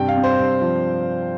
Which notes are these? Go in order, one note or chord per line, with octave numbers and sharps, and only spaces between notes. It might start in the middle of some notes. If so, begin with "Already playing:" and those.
Already playing: G2 C3 G5
F5
C4
C5
G2
F3